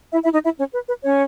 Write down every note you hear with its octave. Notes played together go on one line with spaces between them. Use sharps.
E4 E5
E4 E5
D#4 D#5
E4 E5
C#4 C#5
B4
B4
C#4 C#5